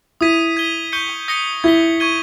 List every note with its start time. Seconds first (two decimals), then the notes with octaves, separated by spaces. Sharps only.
0.21 E4 D#6 G#6 B6 D#7
0.57 G#6 D#7 G7
0.92 C#6 G6 C#7 G7
1.28 D#6 A#6 C#7 G7
1.64 E4 G#6 B6 G7
2.00 C#6 G#6 D#7 G7